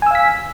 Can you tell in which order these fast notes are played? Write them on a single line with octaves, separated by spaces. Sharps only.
G#5 E6 F5 B6